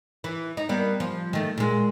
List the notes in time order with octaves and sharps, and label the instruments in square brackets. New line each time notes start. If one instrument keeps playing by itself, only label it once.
[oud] E3
D#4
G3 A#3 B3
F3
D#3 A3
A#2 G#3